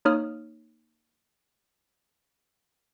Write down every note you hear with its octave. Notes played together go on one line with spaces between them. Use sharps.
A#3 D#4 C#5 D#6 F6